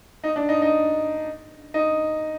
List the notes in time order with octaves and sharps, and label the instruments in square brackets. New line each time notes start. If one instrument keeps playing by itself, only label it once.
[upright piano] D#4
D4
D#4
D#4
D#4